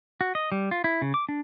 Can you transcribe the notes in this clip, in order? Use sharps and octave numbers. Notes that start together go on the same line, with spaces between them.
F#4
D#5
G3
F4
E4
C#3
D6
D4